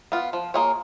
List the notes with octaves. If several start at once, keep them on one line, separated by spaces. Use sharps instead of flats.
B3 F4
F3
A#3 F4 G#4 C#5